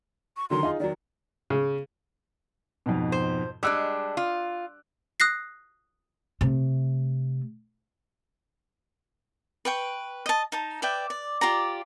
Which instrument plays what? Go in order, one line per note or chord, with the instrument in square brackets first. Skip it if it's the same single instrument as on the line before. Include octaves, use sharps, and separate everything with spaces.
[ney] C#6
[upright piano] D3 D#3 F#3 [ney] C6
[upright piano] D#4 F4 G#4
[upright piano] D#3 F#3 [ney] D5
[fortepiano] C#3
[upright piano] F2 G#2 B2
[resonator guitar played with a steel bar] C5
[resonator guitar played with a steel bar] G3 G#3 D4 [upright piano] D6 E6 F#6
[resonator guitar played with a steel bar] F4
[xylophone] D#6 F#6 A#6 C7
[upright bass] C3 A3
[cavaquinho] B4 G5 C#6
D#5 A5
D#4 A5 A#5
B4 D5 E5 G5
D5
F4 G4 D5 A#5